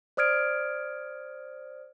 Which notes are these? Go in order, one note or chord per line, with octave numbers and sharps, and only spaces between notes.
C5 D5 D#6 F6 G#6 D7